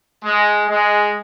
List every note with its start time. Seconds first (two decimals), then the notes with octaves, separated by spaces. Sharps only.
0.22 G#3
0.67 G#3